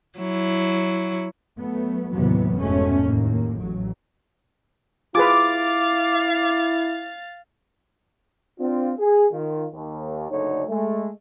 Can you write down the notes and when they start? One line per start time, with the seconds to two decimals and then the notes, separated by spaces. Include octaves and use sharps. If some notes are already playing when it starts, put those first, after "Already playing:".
0.19 F#3 E4
1.57 F#3 A3 B3
2.12 D#2 A2 C3 E3 F#3 B3
2.56 F1 G#2 B2 G#3 A3 C#4
3.03 D#2 A2 A#3
3.57 A1 F#3
5.15 E4 F4 G#4 B4 F5 D6 A6
8.59 C4 D4 F4
8.97 G#4
9.32 D#3 F4
9.73 D#2
10.30 F#1 D2 D3 D#4 C#5 D5
10.68 G#3 A3